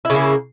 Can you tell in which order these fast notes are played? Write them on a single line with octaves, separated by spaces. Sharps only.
E4 C#3 A#3